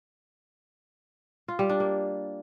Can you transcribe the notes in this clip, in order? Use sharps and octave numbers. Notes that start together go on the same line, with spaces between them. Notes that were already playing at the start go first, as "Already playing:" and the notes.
F4
G3
D4
A#3